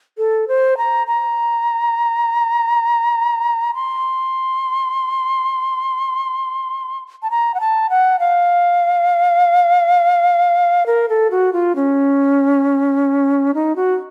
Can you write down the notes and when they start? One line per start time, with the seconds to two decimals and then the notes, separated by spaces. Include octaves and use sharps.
0.18 A4
0.48 C5
0.78 A#5
1.07 A#5
3.74 C6
7.22 A5
7.31 A#5
7.54 F#5
7.60 A5
7.90 F#5
8.19 F5
10.86 A#4
11.09 A4
11.31 F#4
11.53 F4
11.76 C#4
13.54 D#4
13.76 F#4